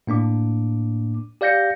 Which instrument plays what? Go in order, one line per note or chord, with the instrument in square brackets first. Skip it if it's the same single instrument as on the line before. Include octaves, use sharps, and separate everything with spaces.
[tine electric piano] A2 A#3 D4 D6
G4 D5 F5 G6 A#6 C#7